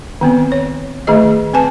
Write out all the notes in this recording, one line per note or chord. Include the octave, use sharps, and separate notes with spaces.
D#3 B3 C4
C#5
D#3 A3 G#4 D#5
C4 B4 G#5 A5